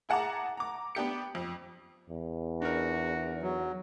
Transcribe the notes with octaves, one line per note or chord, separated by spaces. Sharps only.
E4 G#4 F#5 A5 A#5 D6
A#5 D6
B3 D4 G4 C#7
F2
E2
D4 D#4 F#4 A#4
F#3